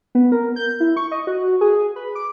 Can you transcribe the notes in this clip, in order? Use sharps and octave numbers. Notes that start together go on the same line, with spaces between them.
B3
A#4
G6
E4
C#6
D#5
F#4
G#4
B4
D6